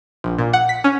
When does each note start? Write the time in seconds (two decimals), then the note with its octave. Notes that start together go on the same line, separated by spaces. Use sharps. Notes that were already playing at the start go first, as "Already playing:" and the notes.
0.24 A#1
0.38 A#2
0.53 F#5
0.69 B6
0.84 C#4